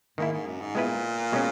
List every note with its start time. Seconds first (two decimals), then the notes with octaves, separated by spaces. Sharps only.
0.18 G#2 D#3 A#3 E4
0.33 G#2
0.47 F#2
0.61 G#2
0.75 A#2 G#3 B3 E4 B4
1.32 B2 G#3 C#4